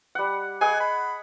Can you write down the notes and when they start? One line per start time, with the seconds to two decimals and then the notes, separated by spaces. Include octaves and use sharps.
0.15 G3 F#5
0.61 G#4 D#5 F#5 G#5
0.80 B5